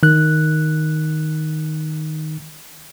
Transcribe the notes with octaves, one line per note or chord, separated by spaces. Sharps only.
D#3 F#6